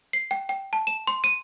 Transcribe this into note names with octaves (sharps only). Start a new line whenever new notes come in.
C7
G5
G5
A5
E7
C6
D#7